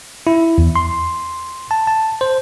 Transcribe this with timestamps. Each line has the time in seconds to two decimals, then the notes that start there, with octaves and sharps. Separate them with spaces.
0.27 E4
0.58 E2
0.76 C6
1.71 A5
1.87 A5
2.21 C5